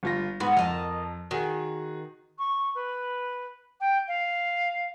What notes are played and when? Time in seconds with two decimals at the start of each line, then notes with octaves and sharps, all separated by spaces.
0.03 G1 F4 A#6
0.40 G#2 B3 F#4
0.57 F2 A#4 D#5 A5
1.31 D#3 F#4 G#4
2.38 C#6
2.75 B4
3.80 G5
4.08 F5